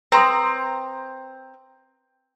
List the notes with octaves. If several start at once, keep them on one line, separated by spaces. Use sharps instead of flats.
C4 B4 A#5 C6 D#6